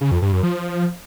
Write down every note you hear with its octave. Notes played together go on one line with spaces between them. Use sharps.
C#3
F2
G2
F#2
F3